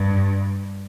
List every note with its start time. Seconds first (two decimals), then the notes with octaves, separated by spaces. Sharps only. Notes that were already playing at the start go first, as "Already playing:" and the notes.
Already playing: G2